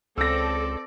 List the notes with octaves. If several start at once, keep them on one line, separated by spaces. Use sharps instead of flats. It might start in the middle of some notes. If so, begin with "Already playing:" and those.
C#2 C4 A4 D5 E6 A#6